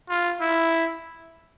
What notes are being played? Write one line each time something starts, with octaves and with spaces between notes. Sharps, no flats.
F4
E4